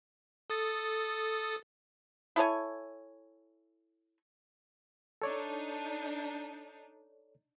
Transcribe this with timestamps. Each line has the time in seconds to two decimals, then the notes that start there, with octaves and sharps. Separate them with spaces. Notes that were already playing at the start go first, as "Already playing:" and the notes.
0.50 A4 D#6 A6
2.36 E4 A4 C#5 G#5
5.22 D4 D#4 A4 C#5 D5